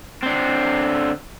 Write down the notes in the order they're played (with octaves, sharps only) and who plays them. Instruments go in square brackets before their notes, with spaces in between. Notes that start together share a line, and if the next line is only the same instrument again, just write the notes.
[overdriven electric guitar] D3 C4